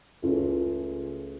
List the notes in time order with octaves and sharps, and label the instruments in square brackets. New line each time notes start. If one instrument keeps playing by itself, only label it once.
[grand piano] C#2 C#3 A3 C#4 F4